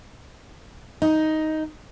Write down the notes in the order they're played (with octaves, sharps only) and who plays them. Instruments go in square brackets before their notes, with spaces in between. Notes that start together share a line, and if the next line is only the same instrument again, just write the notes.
[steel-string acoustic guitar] D#4